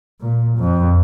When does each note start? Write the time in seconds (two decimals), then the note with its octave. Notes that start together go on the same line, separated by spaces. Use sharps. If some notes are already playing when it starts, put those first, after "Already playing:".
0.20 A#2
0.58 F2